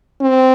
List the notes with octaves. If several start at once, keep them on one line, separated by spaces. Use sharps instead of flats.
C4